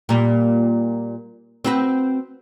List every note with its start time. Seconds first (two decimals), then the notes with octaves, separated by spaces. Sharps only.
0.09 A#2 G3
1.64 C4 F#4 B4